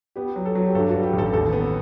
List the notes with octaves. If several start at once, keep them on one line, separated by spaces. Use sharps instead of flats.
B3 G4
F#3
A4
F#3
G4
G2 A4
G3 F#4
G4
A1
A4
G4
D#2 A4
B3